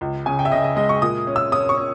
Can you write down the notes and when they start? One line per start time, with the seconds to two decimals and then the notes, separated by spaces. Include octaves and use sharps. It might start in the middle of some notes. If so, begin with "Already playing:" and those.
0.01 C#2
0.26 C#3 G#5
0.39 G5
0.45 E5
0.52 C#3 D#5
0.64 D#5
0.76 G#3 D#5
0.89 C#6
1.02 A#2 D#6
1.27 C#4
1.36 E6
1.52 C#4 D#6
1.69 C#6
1.77 C#4